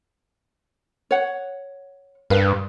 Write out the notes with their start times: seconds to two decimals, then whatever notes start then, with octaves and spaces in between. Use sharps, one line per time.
1.11 C#5 F#5
2.30 G2 A#4 B4 F5